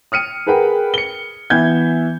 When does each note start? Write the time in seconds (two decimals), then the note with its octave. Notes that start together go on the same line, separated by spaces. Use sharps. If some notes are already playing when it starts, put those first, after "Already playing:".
0.12 D#6 F6 C#7 D#7
0.47 G#4 A#4 B4 F#5 G5
0.94 C#7 G7
1.50 E3 B3 E5 G6 G#6